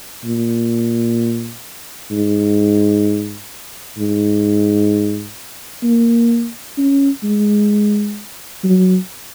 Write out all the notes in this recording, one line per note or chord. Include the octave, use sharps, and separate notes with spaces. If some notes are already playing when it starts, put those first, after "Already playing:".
A#2
G#2
G#2
A#3
C#4
G#3
F#3